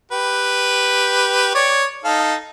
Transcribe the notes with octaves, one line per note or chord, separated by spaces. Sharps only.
G4 B4
C#5 D5 C#6
D#4 A4 F5